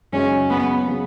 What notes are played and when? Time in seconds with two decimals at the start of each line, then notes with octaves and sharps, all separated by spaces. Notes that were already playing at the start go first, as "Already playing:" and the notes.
0.13 F#2 C#3 G#3 C#4 D#4 F#4
0.50 B3
0.88 C#3 F#3 C#4 F#4